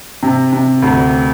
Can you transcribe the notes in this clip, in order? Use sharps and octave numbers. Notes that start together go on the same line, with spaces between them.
C3
C3
D2